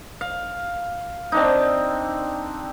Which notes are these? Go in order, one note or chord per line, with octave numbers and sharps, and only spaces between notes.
F5
C4 D4 D#4